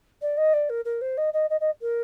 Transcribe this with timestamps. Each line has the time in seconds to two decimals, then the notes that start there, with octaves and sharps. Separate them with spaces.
0.22 D5
0.37 D#5
0.53 D5
0.69 A#4
0.85 A#4
1.01 C5
1.17 D#5
1.33 D#5
1.50 D#5
1.60 D#5
1.81 A#4